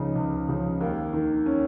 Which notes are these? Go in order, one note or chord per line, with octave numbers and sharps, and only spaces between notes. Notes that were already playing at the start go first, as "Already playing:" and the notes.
Already playing: C#2 C#3 F3 D#4
C#2
C#3 F3
D#2 A#3
D#3
C#4